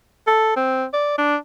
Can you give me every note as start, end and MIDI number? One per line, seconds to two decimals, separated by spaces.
0.27 0.54 69
0.56 0.86 60
0.93 1.15 74
1.18 1.36 62